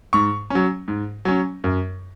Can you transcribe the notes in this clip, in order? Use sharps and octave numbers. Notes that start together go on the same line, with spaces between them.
G#2 C#6
F#3 C#4
G#2
F#3 C#4
F#2